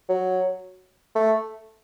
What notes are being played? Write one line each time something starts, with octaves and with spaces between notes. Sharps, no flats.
F#3
A3